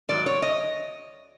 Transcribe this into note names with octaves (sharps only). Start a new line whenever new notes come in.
G#2 D#3 F#3 D5
C#5
D#5